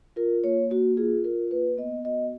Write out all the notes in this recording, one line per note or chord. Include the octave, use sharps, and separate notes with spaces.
F4 A#4
A#3 C#5
A#3 F#4
F4 G#4
F4 A#4
A#3 B4
B3 D#5
F#4 D#5